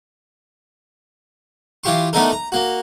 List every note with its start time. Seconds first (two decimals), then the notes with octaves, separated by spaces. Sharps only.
1.84 E3 F4 G4 C6 C#6
2.13 A3 B3 D4 D#4 A4 A#4
2.31 A#5
2.52 A#3 F#4